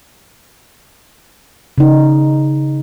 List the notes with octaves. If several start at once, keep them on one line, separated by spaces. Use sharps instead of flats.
C#3 D#4